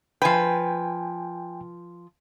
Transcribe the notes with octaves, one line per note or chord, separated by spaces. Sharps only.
F3 B4 G5 G#5